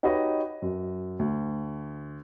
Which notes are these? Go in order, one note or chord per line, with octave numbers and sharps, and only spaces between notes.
D#4 F#4 G4 B4 C#5 D#5
F#2
D2